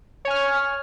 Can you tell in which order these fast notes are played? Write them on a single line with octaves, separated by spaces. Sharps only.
C#5 G#5 F6